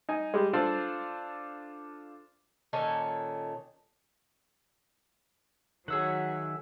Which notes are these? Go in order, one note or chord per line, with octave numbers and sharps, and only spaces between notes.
D#4 G#5
G3 G#3
D4 F4 A4 C5 D5
A#2 D#3 C#4 A4
D#3 F#3 G#4 C#5 E5 F#5